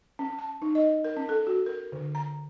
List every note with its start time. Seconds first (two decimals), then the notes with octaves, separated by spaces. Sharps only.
0.19 C#4
0.39 A5
0.62 D#4
0.75 D#5
1.04 A#4
1.17 C#4
1.29 A4
1.47 F#4
1.66 A#4
1.92 D3
2.15 A#5